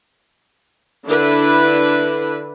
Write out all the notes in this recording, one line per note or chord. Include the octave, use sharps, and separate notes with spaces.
D3 D4 E4 B4